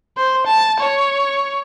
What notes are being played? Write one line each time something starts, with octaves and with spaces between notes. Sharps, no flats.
C5
A5
C#5